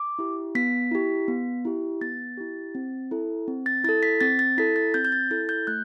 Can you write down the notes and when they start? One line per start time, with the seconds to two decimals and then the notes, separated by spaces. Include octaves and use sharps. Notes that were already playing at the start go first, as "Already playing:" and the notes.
Already playing: D6
0.19 E4 G4
0.55 B3 B6
0.91 E4 G4
1.28 B3
1.65 E4 G4
2.01 B3 A6
2.38 E4 G4
2.75 C4
3.11 E4 A4
3.48 C4
3.66 A6
3.84 E4 A4 A6
4.03 B6
4.21 C4 A6
4.39 A6
4.58 E4 A4 B6
4.76 A6
4.94 C4 G6
5.05 G6
5.12 A6
5.31 E4 A4 A6
5.49 G6
5.67 A3 F#6